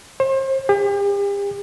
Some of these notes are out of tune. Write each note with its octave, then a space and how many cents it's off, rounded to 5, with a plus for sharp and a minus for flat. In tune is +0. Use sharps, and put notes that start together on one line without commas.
C5 +40
G4 +40